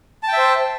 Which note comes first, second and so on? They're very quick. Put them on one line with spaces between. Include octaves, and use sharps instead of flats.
A5 G5 E5 C5